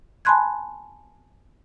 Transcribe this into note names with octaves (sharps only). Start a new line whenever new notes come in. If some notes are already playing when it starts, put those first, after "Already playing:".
G#5 A5 B5 C6 F#6 G#6